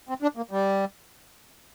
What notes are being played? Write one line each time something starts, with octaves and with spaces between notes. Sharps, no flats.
C4
D4
A#3
G3